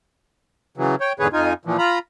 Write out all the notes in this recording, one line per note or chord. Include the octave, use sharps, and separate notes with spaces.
C#3 E3 F#3
C#5 G5
E2 G#2 D3 G#4 B4 C#5
F2 D#4 F4 G#5
A#2 E3 F3
F4 A#5 B5